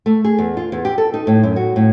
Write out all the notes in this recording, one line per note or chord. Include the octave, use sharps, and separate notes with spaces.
A3
G#4
E2
F4
E2
G4
A4
D#4
A2
F#2
F#4
A2